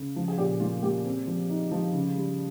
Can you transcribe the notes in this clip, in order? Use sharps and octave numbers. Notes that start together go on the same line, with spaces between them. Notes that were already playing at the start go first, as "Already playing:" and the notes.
Already playing: C#3
F3
G#4
A#2 G4
A#3 F4
A#3 G4
C4
F3
D#4
F3
C#3
G3